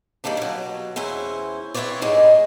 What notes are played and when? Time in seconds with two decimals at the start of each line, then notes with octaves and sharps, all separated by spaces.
0.24 D#2 D#3 G3 A#3 D4
0.37 B2 F#3
0.96 E2 C#4 E4 C5
1.74 C4 E4 F4 B4 C#5 D5
2.02 G#2 G3 G#3 D#4